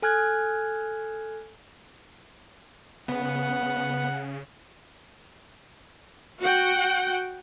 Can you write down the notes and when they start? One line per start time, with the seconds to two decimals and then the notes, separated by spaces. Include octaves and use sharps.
0.02 A4 G#5 F6 F#6 G#6
3.08 C#3 B3 F#5
6.40 F#4 F#5 G5